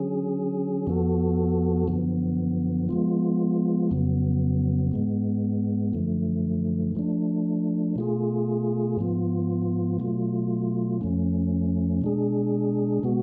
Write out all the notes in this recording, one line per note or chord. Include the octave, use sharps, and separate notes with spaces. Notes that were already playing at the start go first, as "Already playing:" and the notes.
Already playing: D3 F#3 C#4 G#4
F2 F3 B3 F#4 A4
F#2 D3 F3 B3
F3 G#3 B3 F4
F2 C#3 F#3 B3
G#2 G#3 B3
F#2 D3 F3 A3
F3 A3 D4
B2 A3 F4 G#4
G#2 F3 B3 F4
B2 F#3 A3 F4
F2 F3 A3 C#4
B2 G#3 D4 G#4
B2 G#3 B3 F#4